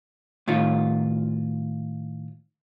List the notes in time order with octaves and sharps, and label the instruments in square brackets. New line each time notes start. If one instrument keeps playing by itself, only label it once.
[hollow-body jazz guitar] A2 D#3 F4